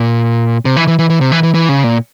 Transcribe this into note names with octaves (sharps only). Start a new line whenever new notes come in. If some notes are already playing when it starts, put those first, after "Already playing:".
Already playing: A#2
C3
E3
E3
E3
E3
C3
E3
E3
E3
C#3
A#2